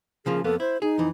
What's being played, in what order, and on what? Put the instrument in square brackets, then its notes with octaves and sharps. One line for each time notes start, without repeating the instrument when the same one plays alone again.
[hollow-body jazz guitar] C#3 F3 A#3 [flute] G#4
[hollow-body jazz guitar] F2 A#3 B3 [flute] A4
[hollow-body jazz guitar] E4 [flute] C5
[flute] D#4 [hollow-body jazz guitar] G#4
[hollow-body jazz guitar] F2 E3